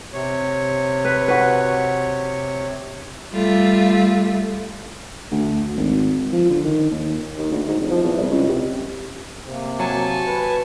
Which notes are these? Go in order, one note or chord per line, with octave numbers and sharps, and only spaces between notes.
C3 C#5
B4
F#4 B4
G3 A3 F4 E5
D2
G#1
F3
D3
D#3
D#2
D#2
D2
G#2
F1
F3
E2
C2
C#2
C3
C3 A#3
F#3 G#5 A5 C#6
B4